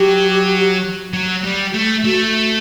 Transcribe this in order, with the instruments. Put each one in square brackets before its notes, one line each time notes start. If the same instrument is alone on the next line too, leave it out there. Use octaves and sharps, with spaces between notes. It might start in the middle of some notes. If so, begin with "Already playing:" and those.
Already playing: [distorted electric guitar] F#3 [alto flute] G4
[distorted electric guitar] F#3
G3
A3
[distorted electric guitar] A3 [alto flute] F#4